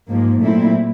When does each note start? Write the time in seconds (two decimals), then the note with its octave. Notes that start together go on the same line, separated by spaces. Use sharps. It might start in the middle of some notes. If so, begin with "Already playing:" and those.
0.09 G#2 F3 A#3
0.41 A#2 F#3 A3 C4 E4